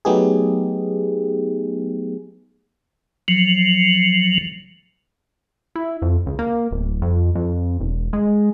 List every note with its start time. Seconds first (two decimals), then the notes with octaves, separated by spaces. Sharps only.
0.05 F#3 A3 B3 D#4 G4 G#4
3.28 F3 F#3
5.76 E4
6.02 F2
6.26 C#2
6.39 A#3
6.71 D1
7.02 F2
7.35 F2
7.80 E1
8.13 G#3